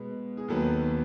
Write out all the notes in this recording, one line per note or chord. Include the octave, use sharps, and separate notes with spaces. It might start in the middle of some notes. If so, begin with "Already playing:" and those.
Already playing: B2 G#3 B3
G#4
D#2 D#3 F#3 B3 A4